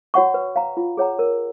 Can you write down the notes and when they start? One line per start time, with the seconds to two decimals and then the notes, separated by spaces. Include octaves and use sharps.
0.14 F#4 C#5 F#5 C#6
0.34 B4
0.56 F5 A#5
0.77 F4
0.97 G#4 C#5 F#5 A#5
1.19 A#4